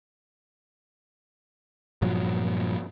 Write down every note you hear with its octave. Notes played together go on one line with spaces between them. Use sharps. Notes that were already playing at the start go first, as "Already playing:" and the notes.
G2 A#2 F3 F#3